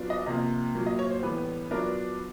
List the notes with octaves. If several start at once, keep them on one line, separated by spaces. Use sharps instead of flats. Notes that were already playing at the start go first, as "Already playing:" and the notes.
Already playing: F#3 B3 D4 F4
D#5
C3 F3 A#3 D#5
A#2 F#3 A#3
D#5
C#5
C5
A2 E3 G3 B3 B4
F#3 B3 D4 F4 A#4